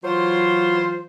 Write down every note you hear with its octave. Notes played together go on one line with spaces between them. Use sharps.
E3 F#3 F4 C5